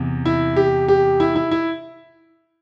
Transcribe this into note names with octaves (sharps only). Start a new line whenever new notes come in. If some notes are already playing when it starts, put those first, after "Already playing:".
Already playing: E2 C3
E4
G4
G4
E4
E4
E4